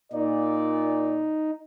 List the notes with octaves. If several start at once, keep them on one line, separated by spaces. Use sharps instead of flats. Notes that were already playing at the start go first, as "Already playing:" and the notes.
A#2 D#4 D5